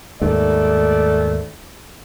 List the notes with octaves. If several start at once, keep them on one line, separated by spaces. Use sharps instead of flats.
D#2 G#2 A3 D5